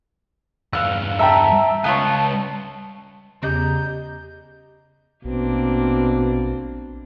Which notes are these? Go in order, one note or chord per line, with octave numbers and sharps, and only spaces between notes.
E2 G2 F5 E6 F#6
E5 G5 A5 A#5 E6
C#2 B3 F4 C#5 A5
E2 C#3 G3 D#5 A#5 G6
A#1 B2 A#3 C4 D4